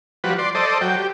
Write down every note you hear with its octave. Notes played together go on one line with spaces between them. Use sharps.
F3 G3 F#4 B4
D5 C6
A4 C5 D5 D#5
F#3 G5
G4